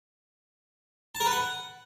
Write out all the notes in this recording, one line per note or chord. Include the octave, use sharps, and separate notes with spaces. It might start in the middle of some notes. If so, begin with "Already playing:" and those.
A5
A#4
B4
F#5